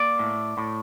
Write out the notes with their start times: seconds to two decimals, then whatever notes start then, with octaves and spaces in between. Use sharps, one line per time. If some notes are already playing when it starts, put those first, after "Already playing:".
Already playing: A#3 D5
0.19 A2
0.58 A2